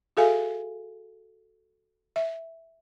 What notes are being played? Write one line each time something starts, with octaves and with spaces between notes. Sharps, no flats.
F#4 G#4 A4 E5 F5 G#5
E5